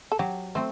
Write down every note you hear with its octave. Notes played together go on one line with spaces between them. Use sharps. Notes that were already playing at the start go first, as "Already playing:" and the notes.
A4
F#3 G4
A3 C4 C5